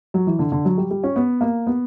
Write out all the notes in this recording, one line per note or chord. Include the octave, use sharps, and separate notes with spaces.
F#3
E3
D3
D3
F#3
G3
G3
C#4
B3
A#3
B3